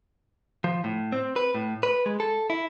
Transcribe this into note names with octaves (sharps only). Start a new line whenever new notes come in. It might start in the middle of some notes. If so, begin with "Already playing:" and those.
F3
A2
C4
B4
A2
B4
G#3
A4
E4